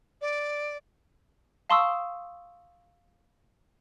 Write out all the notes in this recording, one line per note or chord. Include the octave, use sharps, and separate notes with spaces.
D5
F5 A5 C6 C#6 D#6 E6